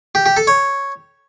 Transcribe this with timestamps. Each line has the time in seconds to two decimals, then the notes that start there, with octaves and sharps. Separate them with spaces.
0.15 G4
0.26 G4
0.37 A4
0.47 C#5